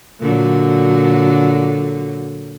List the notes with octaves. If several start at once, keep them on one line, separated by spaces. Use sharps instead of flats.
A#2 D3 F#3